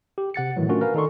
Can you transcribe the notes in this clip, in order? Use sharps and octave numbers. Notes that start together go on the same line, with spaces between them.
G4
C3 F#5 A6 C#7
A2 D#3 E3 F#3
A3 C#4 D4 F4 F#4 A#4
A#4 B4 F5 G#5
D#3 D#4 A4 D5 C6 C#6